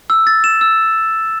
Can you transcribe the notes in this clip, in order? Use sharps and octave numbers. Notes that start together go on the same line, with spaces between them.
E6
A6
E7
E6